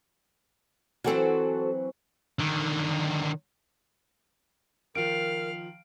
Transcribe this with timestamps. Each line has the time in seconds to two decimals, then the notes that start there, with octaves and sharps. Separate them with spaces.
1.04 E3 F#3 C4 F#4 A4 C5
2.39 D3 D#3
4.95 D#3 F3 A#4 F5 D7